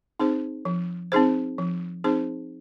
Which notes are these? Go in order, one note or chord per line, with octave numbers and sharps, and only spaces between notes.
C4 D#4 G#4 C5
F3
C4 D#4 G#4 C5
F3
C4 D#4 G#4 C5